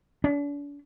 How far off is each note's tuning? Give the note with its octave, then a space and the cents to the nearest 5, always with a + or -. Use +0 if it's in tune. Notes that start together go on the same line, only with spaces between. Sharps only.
D4 -40